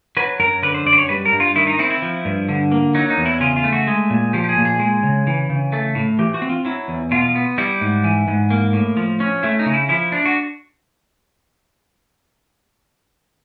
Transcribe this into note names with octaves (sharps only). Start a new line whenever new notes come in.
F#3 B4
F#2 A#4
D3 B4
C5
F#2 D5
C5
C#5
G3 B4
A#4
G2
F4
D#3 E4
D#4
C4 E4
E4
F3
G2
D3
A#3
F#3 D#4
D#4
E2
E4
C#3 F4
F4
A3
F#4
G#3
A#2
F3 G4
G4
G#4
A#2
G#4
G#3
C#3
E3
C#3
A3 A4
A2
E3 G4
F#4
C4
F4
F#3 E4
E2
B2 F4
B3
G3 E4
G#2
E3
G#2
A#3
A2
F3
C#4
A3 E4
D#4
C#3
E4
F3 E4
D4
F#4